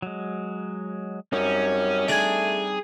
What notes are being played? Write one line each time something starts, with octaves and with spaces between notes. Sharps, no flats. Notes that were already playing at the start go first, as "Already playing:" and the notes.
F#3 G#3
F#2 G3 C4 C#4 D#4
A3 D4 G#4 G#5